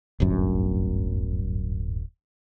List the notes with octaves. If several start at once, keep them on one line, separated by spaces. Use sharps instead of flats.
D1 G1 F#2